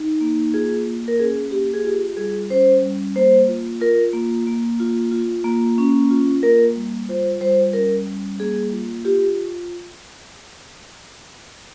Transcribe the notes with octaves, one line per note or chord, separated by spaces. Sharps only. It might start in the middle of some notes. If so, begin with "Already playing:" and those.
Already playing: D#4
A#3
F4 G#4
A#3
A#4
C#4 G#4
A#3 G4
G#4
F4 G4
G3 G#4
C#4 C5
G3
A#3 C5
F4
F4 A#4
A#3
A#3
F4
F4
A#3
C#4
F4
A#3 A#4
G3
F4 C5
G3 C5
C#4 A#4
G3
A#3 G#4
F4
F4 G4